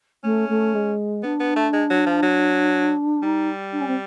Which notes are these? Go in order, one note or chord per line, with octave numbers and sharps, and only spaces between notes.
A3 C#4
A3
G#3
B3 D4
B3
A3
G#3
F#3
F3
F#3
G3 D#4
D4
C#4
C4